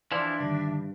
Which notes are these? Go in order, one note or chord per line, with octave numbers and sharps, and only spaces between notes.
E3 F3 D4 E4 D5 E5 C6
G2 D3 D#3